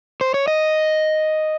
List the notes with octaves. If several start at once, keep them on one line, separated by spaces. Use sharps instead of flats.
C5
C#5
D#5